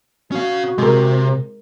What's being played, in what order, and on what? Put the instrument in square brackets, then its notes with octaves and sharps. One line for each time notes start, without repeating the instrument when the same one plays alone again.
[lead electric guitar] C#4 F5 [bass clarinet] F#4
[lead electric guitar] C3 [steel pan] G#3 A#4